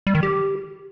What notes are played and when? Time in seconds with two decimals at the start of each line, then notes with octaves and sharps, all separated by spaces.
0.07 G3
0.15 D#3
0.23 G4